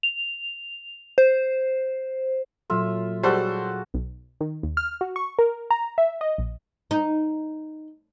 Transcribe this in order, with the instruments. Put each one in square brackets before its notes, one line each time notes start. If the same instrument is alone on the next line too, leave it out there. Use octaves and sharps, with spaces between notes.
[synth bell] F7
C5
[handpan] A#2 F#3 A4 [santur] F4 E5
[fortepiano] G3 C5 [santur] F4 F#4 A4 [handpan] G#4
[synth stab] B1
D#3
D#2
F6
F#4
C#6
A#4
A#5
E5
D#5
A#1
[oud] D#4